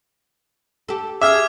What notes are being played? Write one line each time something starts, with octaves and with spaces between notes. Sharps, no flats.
G4 A4
G#4 E5 D6 E6 F6 G#6